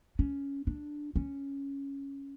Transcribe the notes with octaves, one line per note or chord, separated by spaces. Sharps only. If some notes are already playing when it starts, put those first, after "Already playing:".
C#4
D4
C#4